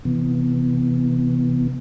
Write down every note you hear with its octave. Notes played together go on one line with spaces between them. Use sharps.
C3 E3 B3